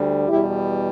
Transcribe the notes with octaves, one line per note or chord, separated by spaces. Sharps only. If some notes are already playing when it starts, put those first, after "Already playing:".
Already playing: D2 D3 G3
E2 B2 G3 E4 G4